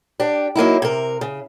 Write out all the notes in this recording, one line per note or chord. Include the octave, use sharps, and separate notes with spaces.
D4 G4
F#3 A#3 D#4 E4
C3 A#4
C#3